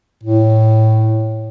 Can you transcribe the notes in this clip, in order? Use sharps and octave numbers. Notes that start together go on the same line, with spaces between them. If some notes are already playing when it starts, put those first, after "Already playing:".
A2